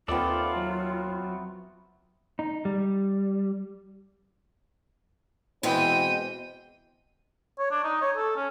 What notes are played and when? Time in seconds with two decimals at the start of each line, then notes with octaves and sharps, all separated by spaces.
0.08 D#2 B3 C4 F4 A4 D5 E5
0.55 F#3
2.39 D#4
2.65 G3
5.63 B2 E3 G#3 C4 G5 D#7
7.59 C#5
7.71 D4
7.84 D#4
8.02 C#5
8.17 A4
8.37 C#4